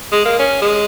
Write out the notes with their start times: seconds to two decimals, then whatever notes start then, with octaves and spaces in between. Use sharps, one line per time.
0.12 G#3
0.25 A#3
0.39 C#4
0.62 G#3